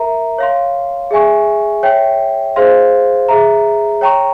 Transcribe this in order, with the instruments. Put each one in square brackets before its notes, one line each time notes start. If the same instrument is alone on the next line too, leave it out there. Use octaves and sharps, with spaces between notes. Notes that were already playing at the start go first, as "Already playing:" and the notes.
Already playing: [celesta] A#4 E5 A#5
C#5 F5 C6
G#4 E5 G#5 C#6
C#5 E5 G5
G#4 C5 F5 C6
G#4 E5 A#5
C#5 G5 A#5 C#6